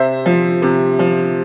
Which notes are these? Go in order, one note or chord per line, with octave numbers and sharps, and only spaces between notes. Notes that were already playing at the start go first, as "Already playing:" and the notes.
Already playing: C3 C5 E5
F3
C3
F3